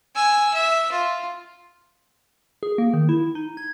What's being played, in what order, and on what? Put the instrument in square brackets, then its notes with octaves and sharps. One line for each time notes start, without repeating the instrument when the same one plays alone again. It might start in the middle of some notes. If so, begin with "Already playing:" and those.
[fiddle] G#5 E6
E5
F4
[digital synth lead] G#4
A#3
D#3
E4
D#4
G#6